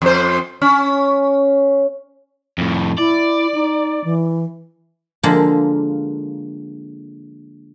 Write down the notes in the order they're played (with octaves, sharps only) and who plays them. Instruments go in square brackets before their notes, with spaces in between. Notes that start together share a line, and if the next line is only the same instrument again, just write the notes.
[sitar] F2 C5
C#4
[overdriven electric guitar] F2 A2
[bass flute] E4 [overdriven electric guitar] D5
[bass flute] D#4
E3
[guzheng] D3 F3 G#3 A#3